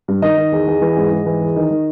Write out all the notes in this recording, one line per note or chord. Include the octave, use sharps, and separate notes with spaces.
G2
D#3 D#5
D#3
E2
E2
E3
G#2
G#2
E3
E2
D#3
D#3